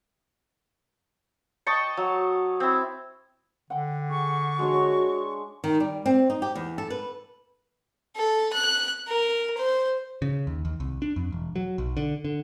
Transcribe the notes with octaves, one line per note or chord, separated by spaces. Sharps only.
D#5 G5 A5 C#6
F#3
C4 E4
D3 F#5 G5
G#4 C#6
G#3 D4 F#4 C#5
D#3
G3
C4
D#4
G4
E2
A4
B4
A4
F#6
A#4
C5
C#3
D#2
D#2
C2
D4
F2
E1
F#3
B1
D3
D3